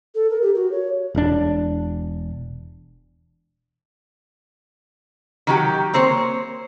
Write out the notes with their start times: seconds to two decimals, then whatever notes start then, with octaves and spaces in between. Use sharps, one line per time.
0.15 A4
0.30 A#4
0.42 G4
0.55 F#4
0.72 C#5
1.15 E1 D4
5.47 D#3 F#3 G4
5.93 A#3 C4 C5 C#5